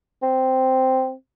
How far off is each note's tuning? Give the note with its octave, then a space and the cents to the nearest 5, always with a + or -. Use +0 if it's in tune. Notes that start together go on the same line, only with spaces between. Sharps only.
C4 -5